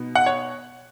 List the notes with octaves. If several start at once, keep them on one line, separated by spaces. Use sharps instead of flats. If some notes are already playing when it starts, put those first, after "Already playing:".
Already playing: B2 B3 D#4
F#5
C#5